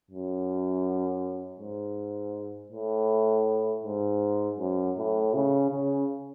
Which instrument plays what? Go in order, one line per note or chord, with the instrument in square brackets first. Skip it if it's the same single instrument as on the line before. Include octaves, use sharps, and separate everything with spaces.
[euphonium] F#2
G#2
A2
G#2
F#2
A2
C#3
C#3